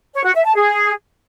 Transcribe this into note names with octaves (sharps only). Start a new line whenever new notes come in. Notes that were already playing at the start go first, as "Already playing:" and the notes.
C#5
F#4
E5
A5
G#4